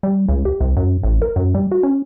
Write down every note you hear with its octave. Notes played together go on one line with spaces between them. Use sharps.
G3
C#2
G4
C2
F#2
A1
A#4
F#2
G3
F#4
C#4